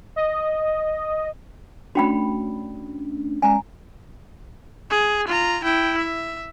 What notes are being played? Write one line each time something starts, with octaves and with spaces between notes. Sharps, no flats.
D#5
A3 C#4 D4 F#4 G5 B5
G#3 C#4 D5 G#5 A#5
G#4
F4 A#5
E4 G5
E5